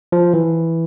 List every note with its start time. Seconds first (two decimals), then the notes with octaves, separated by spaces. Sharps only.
0.12 F3
0.34 E3